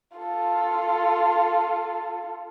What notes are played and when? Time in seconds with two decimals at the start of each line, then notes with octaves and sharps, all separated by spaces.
0.17 F4 A4